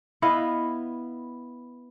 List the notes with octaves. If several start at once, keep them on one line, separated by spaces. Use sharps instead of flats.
B3 E4 D#5 F5